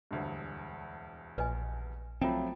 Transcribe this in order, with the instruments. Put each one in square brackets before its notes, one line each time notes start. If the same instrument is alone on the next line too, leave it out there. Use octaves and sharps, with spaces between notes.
[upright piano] E1 D2 G2
[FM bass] A#1 [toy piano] B4 D#5 G#5
[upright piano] F3 F#3 A3 [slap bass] C4 [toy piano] F4 G5